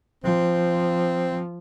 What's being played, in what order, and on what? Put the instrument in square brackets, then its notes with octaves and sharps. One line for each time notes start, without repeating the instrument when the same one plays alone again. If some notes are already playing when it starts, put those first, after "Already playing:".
[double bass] F3 [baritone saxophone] C4